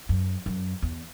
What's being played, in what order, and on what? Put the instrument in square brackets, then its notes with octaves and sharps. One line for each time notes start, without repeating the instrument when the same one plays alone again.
[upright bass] F#2
F#2
E2